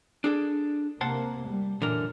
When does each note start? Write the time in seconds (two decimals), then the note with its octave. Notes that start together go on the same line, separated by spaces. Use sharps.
0.24 D4 G#4 A4
1.01 C3 A#3 C5 F#5 A5
1.46 G3
1.82 F#2 A#2 D3 E3 A#4